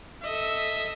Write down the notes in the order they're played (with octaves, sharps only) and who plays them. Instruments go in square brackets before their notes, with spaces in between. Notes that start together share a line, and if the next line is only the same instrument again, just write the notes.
[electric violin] A4 D#5 [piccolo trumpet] E5